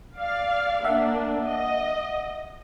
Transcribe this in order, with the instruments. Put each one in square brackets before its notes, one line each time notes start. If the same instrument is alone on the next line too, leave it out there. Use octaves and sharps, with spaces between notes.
[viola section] D5 F5
[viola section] A#3 D4 [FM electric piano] E5 F#5
[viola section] D#5